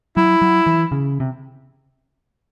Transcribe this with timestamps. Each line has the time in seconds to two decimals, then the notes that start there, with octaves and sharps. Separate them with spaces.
0.17 F#3 E4
0.42 F#3
0.67 E3
0.92 C#3
1.20 C3